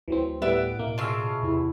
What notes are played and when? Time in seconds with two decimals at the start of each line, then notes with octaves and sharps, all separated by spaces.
0.08 D2 E3 F#3 C4
0.42 A2 G3 B3 E5 F#5 A6 D7
0.79 B2 A#3
0.98 C#3 F4 E5 A5
1.42 E2 C3 E4